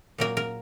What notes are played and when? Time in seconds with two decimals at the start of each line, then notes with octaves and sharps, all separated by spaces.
0.18 A#2 F#3 A#3 A#4
0.37 A#4